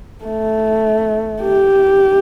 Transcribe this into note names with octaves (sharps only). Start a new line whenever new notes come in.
A3
G4